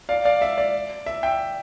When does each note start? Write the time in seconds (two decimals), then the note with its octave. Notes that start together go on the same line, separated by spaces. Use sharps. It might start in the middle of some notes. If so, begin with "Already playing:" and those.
0.09 D5 F5
0.25 D5 F5
0.42 E5
0.58 D5
1.06 E5
1.23 E5 G5